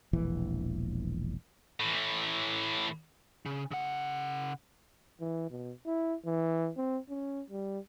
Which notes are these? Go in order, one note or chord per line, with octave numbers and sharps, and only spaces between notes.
E1 A#1 E3
A2 E3
C#3
C#3 F#5
E3
B2
E4
E3
C4
C#4
G3